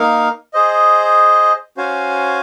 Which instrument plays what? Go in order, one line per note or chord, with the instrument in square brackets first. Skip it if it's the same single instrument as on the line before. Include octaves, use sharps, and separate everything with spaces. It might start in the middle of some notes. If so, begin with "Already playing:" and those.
Already playing: [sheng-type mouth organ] A#3 D#4 A#4 F5
G#4 C5 D#5
C#4 F#4 C5 F5 G#5